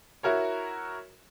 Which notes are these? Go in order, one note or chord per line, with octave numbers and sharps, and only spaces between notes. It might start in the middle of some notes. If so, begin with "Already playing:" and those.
E4 F#4 A#4 C#5